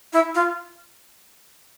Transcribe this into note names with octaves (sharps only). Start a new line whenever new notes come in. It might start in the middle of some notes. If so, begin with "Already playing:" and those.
E4
F4